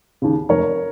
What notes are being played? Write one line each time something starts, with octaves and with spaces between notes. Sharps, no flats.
D#2 C#3
F1 A#4 C#5